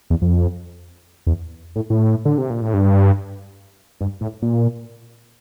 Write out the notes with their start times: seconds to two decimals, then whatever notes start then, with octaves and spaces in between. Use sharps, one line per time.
0.10 E2
0.22 F2
1.27 E2
1.76 A2
1.90 A2
2.25 D3
2.38 C3
2.50 A#2
2.62 A2
2.74 G2
4.01 G2
4.21 A2
4.42 A#2